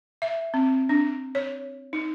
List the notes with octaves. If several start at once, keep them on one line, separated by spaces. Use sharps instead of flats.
E5
C4
D4
C#5
D#4